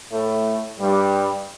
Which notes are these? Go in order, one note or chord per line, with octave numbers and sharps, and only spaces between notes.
A2 A3
G2 G3